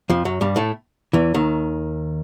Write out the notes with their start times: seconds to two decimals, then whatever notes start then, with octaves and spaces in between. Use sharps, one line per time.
0.10 F2 F3
0.25 F#2 F#3
0.41 G2 G3
0.56 A2 A3
1.13 E2 E3
1.34 D#2 D#3